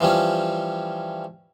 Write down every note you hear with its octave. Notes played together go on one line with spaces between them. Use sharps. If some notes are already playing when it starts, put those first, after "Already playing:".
E3 F3 G3 C#4